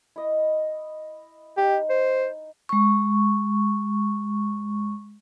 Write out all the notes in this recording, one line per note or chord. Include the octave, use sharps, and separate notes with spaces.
E4 D#5
D#4 G4
C5
G#3 C#6